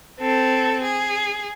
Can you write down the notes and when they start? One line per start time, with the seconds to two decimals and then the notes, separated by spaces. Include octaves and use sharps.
0.20 C4 A4
0.83 G#4